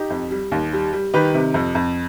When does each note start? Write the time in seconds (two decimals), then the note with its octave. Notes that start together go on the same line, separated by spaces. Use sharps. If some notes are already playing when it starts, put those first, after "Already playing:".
Already playing: D#4 G4
0.10 F2
0.31 G3
0.52 D#2
0.73 G3
0.93 G3
1.13 D#3 G4 B4
1.34 C3
1.54 F2
1.75 F2